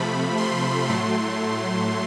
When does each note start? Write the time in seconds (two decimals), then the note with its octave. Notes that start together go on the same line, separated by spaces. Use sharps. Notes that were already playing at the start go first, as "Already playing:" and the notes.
Already playing: C3 F3 A3 B5
0.38 C6
0.89 A2 F#3 A3 C6